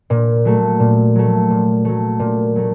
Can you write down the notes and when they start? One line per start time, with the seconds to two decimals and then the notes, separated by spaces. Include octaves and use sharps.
0.10 A#2
0.45 F#3 A3
0.80 A#2
1.15 F#3 A3
1.50 A#2
1.85 F#3 A3
2.20 A#2
2.56 F#3 A3